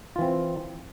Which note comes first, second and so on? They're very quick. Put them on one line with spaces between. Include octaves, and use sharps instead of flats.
F4 E3 C4